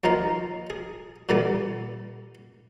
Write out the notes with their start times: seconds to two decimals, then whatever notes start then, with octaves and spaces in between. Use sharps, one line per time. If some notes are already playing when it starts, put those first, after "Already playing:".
0.04 D#2 F3 D#4 A#4 C6
0.70 G#4
1.29 A#2 D3 E3 G3 B3